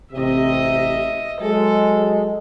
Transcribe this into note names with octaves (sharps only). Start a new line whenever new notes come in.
A1 C3 D#5 E5
F#3 G#3 A4